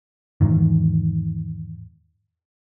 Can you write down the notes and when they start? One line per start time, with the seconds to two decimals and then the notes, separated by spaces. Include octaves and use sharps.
0.41 E2 G#2 D#3